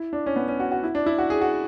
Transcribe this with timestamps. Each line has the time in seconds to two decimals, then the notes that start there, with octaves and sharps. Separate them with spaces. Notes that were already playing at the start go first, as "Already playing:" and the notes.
Already playing: E4
0.13 D4
0.26 C#4
0.36 B3
0.48 C#4
0.60 F#4
0.72 F#4
0.83 E4
0.95 D4
1.06 E4
1.19 F#4
1.30 G#4
1.41 F#4